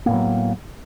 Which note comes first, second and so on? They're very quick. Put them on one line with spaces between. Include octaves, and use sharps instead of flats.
A#3 A2 B3 F#3